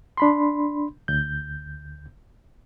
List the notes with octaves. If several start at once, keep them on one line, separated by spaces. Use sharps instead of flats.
D4 B5 C6
D2 G6